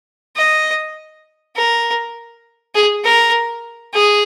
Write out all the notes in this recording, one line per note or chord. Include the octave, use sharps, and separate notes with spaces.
D#5
A#4
G#4
A#4
G#4